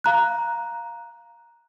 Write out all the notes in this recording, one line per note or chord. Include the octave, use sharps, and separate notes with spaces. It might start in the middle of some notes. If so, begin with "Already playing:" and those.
F5 A#5 F#6